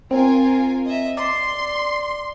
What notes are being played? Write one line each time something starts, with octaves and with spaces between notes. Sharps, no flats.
C4 F4 A#4 G#5
D#5 E5
D5 C6